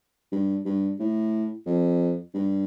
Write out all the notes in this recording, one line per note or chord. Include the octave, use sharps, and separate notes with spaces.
G2
G2
A2
F2
G2